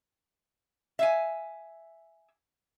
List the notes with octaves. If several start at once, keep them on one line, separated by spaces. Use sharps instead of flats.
E5 F5 G#5